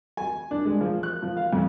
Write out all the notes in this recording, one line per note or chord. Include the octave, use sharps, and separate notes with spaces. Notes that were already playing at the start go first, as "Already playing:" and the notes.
G#5
D4
G#3
F3
F#6
F3
F5
F2